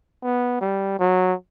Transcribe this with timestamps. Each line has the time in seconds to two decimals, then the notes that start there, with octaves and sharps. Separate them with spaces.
0.23 B3
0.61 G3
0.99 F#3